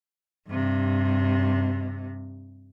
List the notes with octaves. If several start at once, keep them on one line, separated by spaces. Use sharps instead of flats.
G2 C3